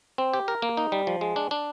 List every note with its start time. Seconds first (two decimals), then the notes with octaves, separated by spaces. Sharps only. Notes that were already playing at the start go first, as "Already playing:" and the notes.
0.18 C4
0.34 G4
0.48 A#4
0.62 A#3
0.77 D#4
0.92 G3
1.07 F3
1.21 G#3
1.36 D4
1.51 D4